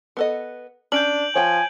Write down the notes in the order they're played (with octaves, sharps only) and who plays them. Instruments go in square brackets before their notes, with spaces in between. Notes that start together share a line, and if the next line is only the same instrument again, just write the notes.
[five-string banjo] B3 A4 D#5
[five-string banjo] C#4 [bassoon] D4 [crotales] G6 D7 F#7
[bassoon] F3 [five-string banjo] C#5 G5 [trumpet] G#5